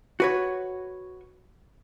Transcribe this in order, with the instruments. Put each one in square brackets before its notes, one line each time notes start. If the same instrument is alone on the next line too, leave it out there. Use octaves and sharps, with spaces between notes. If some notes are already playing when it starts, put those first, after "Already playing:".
[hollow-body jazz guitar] F#4 B4 C#5